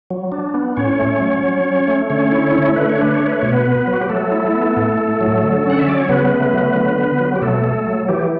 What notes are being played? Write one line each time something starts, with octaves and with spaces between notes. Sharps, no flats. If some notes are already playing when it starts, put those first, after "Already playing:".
F#3
D4
B3
A2 C#4 C#5
A3
F#3
F#3
C#4
A3
D3 C#4 C#5
E4
A3
D3 B4
C#5
D4 B4
C#5
A3
B4
B2 C#5
B3 B4
B3
F#3
F#4
G4
F#3 A3 A4
E4
B3
A2
A3
F#3
D3
C#4
F#5
E5
F#3 D5
C#5
C#3 B3 B4
A3
F#3
D3
B3
F#3
G4
B2 A3 A4
A3
F#3
E3 G4